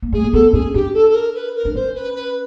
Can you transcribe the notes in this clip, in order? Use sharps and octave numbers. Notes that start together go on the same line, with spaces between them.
A#3
A3 G#4
A#3
B3 A4
C#4 G#4
D4 G4
A4
A4
A#4
B4
A#4
D4
C#4 C5
B4
B4